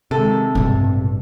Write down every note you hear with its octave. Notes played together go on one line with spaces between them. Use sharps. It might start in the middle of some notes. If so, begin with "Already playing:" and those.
C3 D#3 G#3 A4
A1 G2 B2